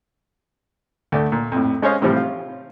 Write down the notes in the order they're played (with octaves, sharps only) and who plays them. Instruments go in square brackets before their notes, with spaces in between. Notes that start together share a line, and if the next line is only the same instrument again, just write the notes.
[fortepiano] D2 A3 D5
A#2
F2 A2
G#3 C#4 C5 C#5 D#5 F5
A2 C3 E3 F3 G3
F4